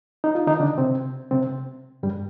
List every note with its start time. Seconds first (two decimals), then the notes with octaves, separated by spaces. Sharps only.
0.24 D#4
0.35 F4
0.47 D#3 D#4
0.60 D3 D4
0.78 C3 C4
1.31 C3 C4
2.03 G2 G3